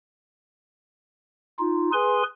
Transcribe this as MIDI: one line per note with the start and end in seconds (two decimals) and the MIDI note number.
1.59 1.90 63
1.59 1.90 65
1.93 2.23 68
1.93 2.23 71
1.93 2.23 80
1.93 2.23 84